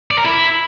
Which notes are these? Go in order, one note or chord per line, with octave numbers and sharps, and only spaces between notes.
D5
A#4
E4